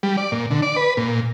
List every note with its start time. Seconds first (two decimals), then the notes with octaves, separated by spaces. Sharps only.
0.03 G3
0.17 D5
0.32 A#2
0.51 D3
0.62 D5
0.76 B4
0.97 A#2